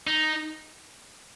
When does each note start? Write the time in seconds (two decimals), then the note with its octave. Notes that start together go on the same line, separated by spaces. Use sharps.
0.07 D#4